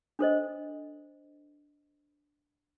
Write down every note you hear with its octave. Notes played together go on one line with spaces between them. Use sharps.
D4 A4 C5 D#5